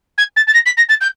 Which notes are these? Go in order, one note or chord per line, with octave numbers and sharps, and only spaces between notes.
G#6
A6
A6
A#6
B6
A#6
A6
G6